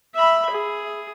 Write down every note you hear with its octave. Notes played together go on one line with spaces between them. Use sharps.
E5 B5
G#4